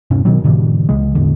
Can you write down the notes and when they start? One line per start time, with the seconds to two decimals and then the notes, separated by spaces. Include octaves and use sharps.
0.11 D#1 G2 C3 C#4
0.25 B2 D#3 F#3
0.44 G#2 B2 D3 E3
0.89 C#2 C#3 G#3
1.15 A1 E2 D3